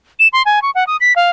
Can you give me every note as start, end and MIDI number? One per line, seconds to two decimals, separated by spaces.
0.19 0.28 100
0.33 0.42 84
0.45 0.62 80
0.62 0.70 85
0.75 0.84 78
0.87 0.97 87
1.00 1.13 95
1.16 1.30 77